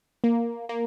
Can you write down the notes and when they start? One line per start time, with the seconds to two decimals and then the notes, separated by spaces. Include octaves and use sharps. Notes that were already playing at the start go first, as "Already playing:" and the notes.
0.24 A#3
0.69 A#3